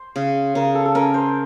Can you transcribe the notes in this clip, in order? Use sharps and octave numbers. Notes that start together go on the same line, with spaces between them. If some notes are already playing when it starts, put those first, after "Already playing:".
Already playing: C5
C#3
C#3 A#4
A4
A4
C#4 A#4
C5